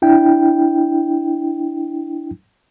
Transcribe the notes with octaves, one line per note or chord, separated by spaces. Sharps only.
D4 E4 G5